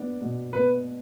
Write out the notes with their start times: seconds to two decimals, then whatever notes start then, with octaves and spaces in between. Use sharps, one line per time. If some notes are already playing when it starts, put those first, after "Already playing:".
Already playing: B3 D4
0.21 B2
0.53 B3 B4